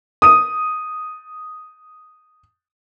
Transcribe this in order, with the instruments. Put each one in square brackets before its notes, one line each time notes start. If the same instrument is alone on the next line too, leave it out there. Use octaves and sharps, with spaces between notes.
[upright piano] D#6 D#7